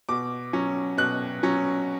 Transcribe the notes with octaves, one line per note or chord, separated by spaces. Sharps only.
B2 D6
F#3 C#4
B2 F#6
F#3 C#4